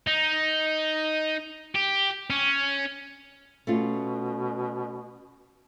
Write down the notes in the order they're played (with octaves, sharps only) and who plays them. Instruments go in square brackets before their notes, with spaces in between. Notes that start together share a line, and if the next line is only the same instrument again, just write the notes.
[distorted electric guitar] D#4
G4
C#4
[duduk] B2 [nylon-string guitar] A3 C#4 F4